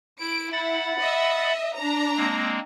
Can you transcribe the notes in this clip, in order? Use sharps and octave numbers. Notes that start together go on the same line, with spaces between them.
E4 D7
E4 F#5 B5 A6
D#5 E5
D4 A#5
G#3 A#3 C4